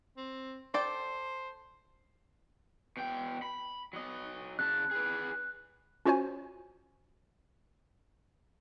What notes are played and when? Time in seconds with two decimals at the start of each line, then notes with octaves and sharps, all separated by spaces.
0.17 C4
0.74 A4 C5 D5 G5
2.97 B2 G5
3.42 B5
3.93 F#3 D#5
4.59 C#3 A5 F#6
4.91 G#4 B4
6.05 C#4 F4 F#4 C5 C#5 G#5